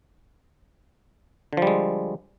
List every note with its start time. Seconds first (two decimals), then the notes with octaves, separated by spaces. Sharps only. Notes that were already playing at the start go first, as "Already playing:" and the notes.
1.53 D3
1.57 F3
1.62 G3
1.67 G#3